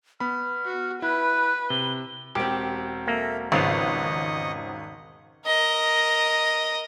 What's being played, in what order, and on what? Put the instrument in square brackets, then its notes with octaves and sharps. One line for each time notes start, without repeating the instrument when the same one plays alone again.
[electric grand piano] B3 B5 [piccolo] F6
[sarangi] F#4
[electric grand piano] E4 [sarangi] B4 [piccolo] F#6
[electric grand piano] C3 [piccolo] G7
[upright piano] E1 C4 [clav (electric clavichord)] G4
[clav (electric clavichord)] A#3 [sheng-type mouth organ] A4 E5
[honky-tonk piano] G#1 [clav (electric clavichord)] C#3 F3 B3 [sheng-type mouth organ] D#5 C#6 D#6
[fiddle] A#4 D#5